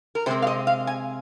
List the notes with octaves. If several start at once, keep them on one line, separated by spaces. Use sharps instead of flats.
A#4
C3 G#3 C4 C5
F5
D#5
F5
G#5